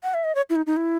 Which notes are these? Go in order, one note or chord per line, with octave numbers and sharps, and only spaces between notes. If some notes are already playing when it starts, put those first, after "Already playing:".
F#5
E5
D#5
C#5
E4
D#4
D#4
E4